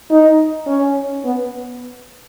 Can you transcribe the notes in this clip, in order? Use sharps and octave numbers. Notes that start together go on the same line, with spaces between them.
D#4
C#4
B3